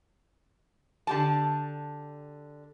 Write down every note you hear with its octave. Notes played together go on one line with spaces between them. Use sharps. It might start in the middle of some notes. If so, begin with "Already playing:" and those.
D3 G4 A5